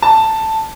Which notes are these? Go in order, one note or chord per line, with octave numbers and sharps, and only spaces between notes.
A5